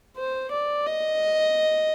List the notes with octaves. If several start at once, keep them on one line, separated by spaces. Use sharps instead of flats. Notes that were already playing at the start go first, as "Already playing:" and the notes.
C5
D5
D#5